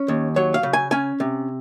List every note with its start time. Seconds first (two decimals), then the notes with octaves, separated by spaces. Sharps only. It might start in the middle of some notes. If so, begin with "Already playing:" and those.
Already playing: C#4
0.08 D#2
0.36 F#3 C#5
0.54 F5
0.63 C#3
0.73 G#5
0.91 C#4 G#5
1.20 C3